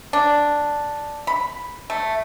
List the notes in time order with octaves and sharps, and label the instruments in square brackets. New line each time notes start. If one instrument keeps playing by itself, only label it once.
[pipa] D4
B5
A3